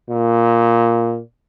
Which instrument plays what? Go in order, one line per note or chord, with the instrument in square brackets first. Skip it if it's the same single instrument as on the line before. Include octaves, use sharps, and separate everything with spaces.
[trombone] A#2